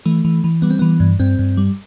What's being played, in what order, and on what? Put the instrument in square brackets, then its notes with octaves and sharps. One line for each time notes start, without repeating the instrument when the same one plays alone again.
[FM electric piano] E3 A3
E3
E3
G3 B3
C4
E3 B3
G2
G2 C4
G2
G3